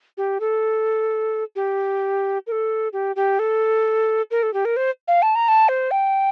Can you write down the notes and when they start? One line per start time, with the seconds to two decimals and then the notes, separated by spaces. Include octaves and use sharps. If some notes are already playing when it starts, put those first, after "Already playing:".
0.18 G4
0.40 A4
1.56 G4
2.47 A#4
2.52 A4
2.93 G4
3.16 G4
3.39 A4
4.31 A#4
4.43 A4
4.54 G4
4.65 A#4
4.77 C5
5.08 F5
5.22 A5
5.35 A#5
5.48 A5
5.69 C5
5.91 G5